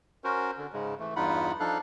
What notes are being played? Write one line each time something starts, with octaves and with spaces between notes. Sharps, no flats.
C#4 F#4 A#4 C5
D3
G#2 C#3 G#3
E3 A3
E2 G2 D#4 F4 F#5 B5
F3 D4 D#4 A4 F5 F#6